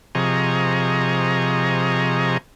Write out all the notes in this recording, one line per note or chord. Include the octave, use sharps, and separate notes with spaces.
C3 F3 G#4 D#5 A#5 C#6